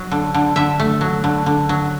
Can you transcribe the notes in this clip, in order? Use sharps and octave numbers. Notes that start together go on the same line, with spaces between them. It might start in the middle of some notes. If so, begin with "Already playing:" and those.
Already playing: F#3
D3
D3
D3 E5
A3
F#3
D3
D3
F#3